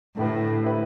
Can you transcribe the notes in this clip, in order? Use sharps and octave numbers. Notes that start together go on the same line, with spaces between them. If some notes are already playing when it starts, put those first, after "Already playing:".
A2 D3 A3 E4 G4 B4
D3 A3 E4 G4 B4